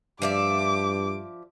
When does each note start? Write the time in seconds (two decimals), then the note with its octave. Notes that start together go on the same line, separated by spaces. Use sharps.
0.22 G2 F3 D5 E5 D6